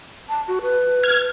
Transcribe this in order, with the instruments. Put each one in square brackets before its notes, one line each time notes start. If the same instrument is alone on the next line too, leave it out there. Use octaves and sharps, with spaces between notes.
[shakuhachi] A5
F#4
B4
[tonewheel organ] F6 G#6